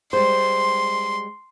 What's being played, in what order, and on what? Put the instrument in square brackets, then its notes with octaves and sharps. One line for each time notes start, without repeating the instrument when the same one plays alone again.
[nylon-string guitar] G3 G#3 C5 [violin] C6